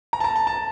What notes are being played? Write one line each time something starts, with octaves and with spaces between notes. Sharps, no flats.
A#5
A5
A#5
A5
A5